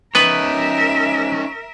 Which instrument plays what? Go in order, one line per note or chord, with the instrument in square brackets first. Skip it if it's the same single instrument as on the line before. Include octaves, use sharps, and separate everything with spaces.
[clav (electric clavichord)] B3 B4 [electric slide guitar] C#4 D#4 C#5 [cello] A#4 E5